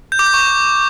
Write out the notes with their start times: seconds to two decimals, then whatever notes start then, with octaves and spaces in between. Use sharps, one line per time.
0.12 G6
0.19 D6
0.26 G6
0.34 C#6